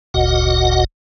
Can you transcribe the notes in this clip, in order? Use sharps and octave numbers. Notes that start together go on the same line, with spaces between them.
F#1 D2 A#2 F#4 D#5 F#5